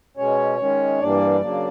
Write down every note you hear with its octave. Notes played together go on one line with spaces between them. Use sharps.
B2 G#3 C#4 C#5
D#3 G#3 C#4
G2 E3 G3 A#3 D4 D5
C#3 F#3 A#3 D4